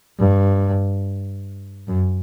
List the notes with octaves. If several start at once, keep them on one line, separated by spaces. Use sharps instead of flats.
G2
F#2